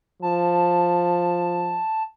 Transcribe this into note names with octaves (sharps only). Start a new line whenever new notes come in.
F3 A5